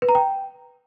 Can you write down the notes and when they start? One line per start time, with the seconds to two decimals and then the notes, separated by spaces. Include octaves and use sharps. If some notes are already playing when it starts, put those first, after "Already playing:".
0.02 B4
0.09 A#5
0.15 G5